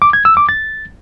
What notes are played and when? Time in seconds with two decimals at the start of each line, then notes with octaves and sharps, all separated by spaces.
0.02 D6
0.13 G#6
0.25 E6
0.37 D6
0.49 A6